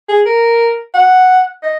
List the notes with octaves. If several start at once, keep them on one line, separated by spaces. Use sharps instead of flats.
G#4
A#4
F#5
D#5